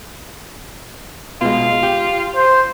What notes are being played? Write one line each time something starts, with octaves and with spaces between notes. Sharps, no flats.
B2 G#3 F4
G4
C5